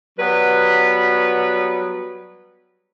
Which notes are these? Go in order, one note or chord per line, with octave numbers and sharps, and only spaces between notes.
F#3 G3 B3 B4